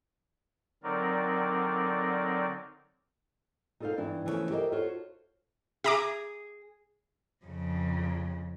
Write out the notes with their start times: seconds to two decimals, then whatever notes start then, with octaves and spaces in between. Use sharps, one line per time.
0.83 D3 F#3 C4 D#4 A#4 D5
3.80 D#4 F4 A4 B4 C5 F5
3.98 G2 E3 D4 E4
4.25 C#3 E3 F3 G3 A3 C#4
4.51 G4 A4 A#4 C5 D#5 E5
4.72 F4 F#4 A4 C5 C#5
5.84 G#4 E5 A#5 D6
7.45 F2 C#3